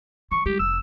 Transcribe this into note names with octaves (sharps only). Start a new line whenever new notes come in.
E3 C#6
G3 G#3 G4
F1 E6